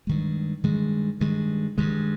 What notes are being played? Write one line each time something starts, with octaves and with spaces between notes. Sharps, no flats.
G2 D#3 G#3
G2 D#3 G#3
G2 D#3 G#3
G2 D#3 G#3